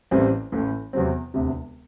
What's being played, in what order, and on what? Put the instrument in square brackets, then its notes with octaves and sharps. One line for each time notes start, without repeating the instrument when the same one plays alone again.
[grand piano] A1 A2 E3 G3 C4
A1 A2 E3
E2 C3 F#3 C4
E1 D2 C3